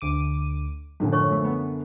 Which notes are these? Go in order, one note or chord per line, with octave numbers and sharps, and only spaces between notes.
D2 D6 D#7
F#2 A2 D3 F3 C#4
C#5 C#6
F3 A3
B3